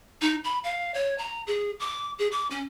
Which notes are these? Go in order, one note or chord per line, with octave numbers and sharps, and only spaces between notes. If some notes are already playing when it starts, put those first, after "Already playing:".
D#4
B5
F5
C#5
A#5
G#4
D6
G#4
D6
C#4